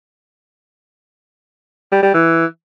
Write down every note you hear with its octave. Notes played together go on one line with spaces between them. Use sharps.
G3
G3
E3